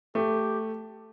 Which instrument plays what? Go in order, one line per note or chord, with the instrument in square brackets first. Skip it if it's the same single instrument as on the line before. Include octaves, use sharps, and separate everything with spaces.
[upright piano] A3 [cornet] G4